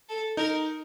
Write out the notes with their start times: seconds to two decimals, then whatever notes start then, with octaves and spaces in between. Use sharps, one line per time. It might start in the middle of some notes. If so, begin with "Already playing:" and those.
0.09 A4
0.37 D#4 A#4